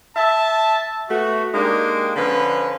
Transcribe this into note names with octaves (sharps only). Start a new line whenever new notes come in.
E5 A5
A3 B3 F#4
G#3 A#3 D4 D#4 G4
D3 F3 C#4 B4